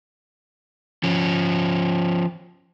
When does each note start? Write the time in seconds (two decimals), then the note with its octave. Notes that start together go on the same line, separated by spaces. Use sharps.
1.04 F3 C#4